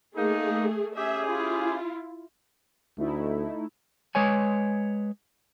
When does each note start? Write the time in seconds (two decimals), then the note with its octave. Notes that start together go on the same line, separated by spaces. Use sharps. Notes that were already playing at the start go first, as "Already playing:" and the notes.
0.17 A3 A#3 D#4 G#4
0.96 C#4 G4 G#4 E5
1.27 E4 F4
2.98 D2 A3 D#4 E4
4.15 G#3 B4 C#5 G#5